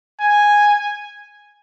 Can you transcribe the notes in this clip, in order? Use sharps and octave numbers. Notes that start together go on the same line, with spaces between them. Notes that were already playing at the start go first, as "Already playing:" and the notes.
G#5